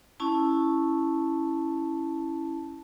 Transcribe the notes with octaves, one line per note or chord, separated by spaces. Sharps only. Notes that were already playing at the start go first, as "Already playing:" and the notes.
C#4 E4 A5